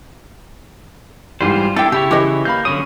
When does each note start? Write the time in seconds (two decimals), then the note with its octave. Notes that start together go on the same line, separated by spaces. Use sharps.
1.41 G#2 E3 G3 F4 C5
1.76 D4 E4 G4 A4 G5 E6
1.92 C#3 E4 G4 C#5
2.11 E3 G4 B4 D#5
2.45 A#3 F5 B5 G6
2.65 D3 F#3 C#4 D#6 D#7